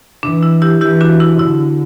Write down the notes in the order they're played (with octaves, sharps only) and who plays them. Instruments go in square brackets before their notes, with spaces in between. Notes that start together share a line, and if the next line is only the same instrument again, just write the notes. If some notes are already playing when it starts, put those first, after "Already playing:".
[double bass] E3 [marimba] D4
[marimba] E4
E4 G4
[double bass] E3 [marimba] E4 G4
[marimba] D4 F#4
E4
[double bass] D3 [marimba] E4